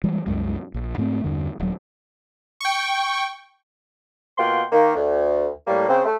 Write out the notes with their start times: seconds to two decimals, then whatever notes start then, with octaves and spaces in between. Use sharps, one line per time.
0.04 E3 G3 G#3
0.26 C2 F#2 G#3
0.74 A#1
0.98 G#2 A3 B3 C4
1.24 E2 G2 D3
1.60 D#1 F#3
2.61 G5 C#6
4.38 B2 A#3 F4 F#5 G5 C6
4.72 D#3 A#3
4.96 D2
5.67 A2 G3 A#3
5.89 C#3 C4
6.05 A3